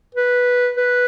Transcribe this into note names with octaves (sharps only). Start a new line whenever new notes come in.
B4
B4